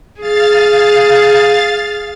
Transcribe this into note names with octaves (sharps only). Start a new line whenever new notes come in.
G#4 F5 A6